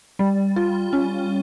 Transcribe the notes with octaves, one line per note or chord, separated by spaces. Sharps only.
G3
F4
C#4